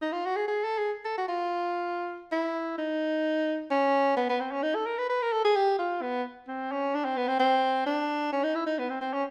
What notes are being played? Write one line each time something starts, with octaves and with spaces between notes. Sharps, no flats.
D#4
F4
F#4
G#4
G#4
A4
G#4
A4
F#4
F4
E4
D#4
C#4
B3
B3
C4
C#4
D#4
A4
A#4
B4
B4
A#4
A4
G#4
G4
F4
B3
C4
C#4
D4
C4
B3
C4
C4
D4
C#4
D#4
E4
D#4
B3
C4
C4
C#4